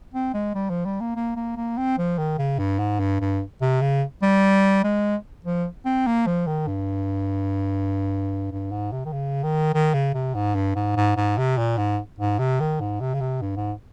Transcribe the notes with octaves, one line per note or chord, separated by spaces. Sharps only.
C4
G#3
G3
F3
G3
A#3
A#3
A#3
A#3
C4
F3
D#3
C#3
G2
G#2
G2
G2
C3
C#3
G3
G#3
F3
C4
A#3
F3
D#3
G2
G2
G#2
C3
D#3
C#3
D#3
D#3
C#3
C3
G#2
G2
G#2
G#2
G#2
C3
A#2
G#2
G#2
C3
D#3
G#2
C3
C#3
C3
G2
G#2